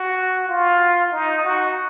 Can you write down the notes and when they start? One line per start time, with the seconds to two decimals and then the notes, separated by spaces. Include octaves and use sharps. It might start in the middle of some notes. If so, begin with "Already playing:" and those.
Already playing: F#4
0.49 F4
1.12 D#4
1.44 F#4